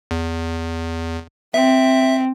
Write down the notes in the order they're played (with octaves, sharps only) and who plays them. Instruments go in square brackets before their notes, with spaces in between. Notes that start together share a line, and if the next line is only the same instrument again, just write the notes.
[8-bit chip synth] E2
[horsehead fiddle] C4 [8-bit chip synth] E5